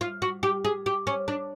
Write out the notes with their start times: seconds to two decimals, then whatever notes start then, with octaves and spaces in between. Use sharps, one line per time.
0.01 F4
0.22 F#4
0.43 G4
0.65 G#4
0.86 G4
1.07 C#4
1.28 D4